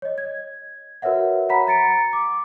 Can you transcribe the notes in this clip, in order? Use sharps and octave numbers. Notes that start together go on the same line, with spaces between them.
C#5 D#5
G#6
F#4 A#4 B4 C#5 E5 F#5
C#5 F#5 A#5 B5 B6
A#5 A6 C#7 D7
D6